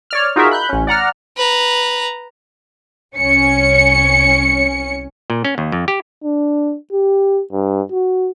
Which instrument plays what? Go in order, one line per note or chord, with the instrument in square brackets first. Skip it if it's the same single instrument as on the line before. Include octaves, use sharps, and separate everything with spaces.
[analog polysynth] C#5 D5 F6
D#4 F4 F#4 G#4 A#4 E5
B5 F#6 G6
A1 C#4
D5 F#5 A#5 F6
[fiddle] B4 A#5
[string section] C2 C#4 C#7
[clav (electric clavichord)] A#2
C#4
D#2
F2
G4
[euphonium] D4
G4
G2
F#4